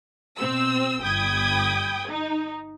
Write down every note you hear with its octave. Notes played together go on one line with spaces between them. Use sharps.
B2 C4 E6
G1 G5 B5 D#6 G#6
D#4